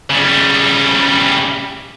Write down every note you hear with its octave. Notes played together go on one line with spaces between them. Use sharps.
C#3 G3